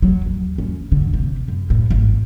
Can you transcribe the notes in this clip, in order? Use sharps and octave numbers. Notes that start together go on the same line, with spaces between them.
F#3
D#2
C#4
D3
C3
F#2
A2
G#1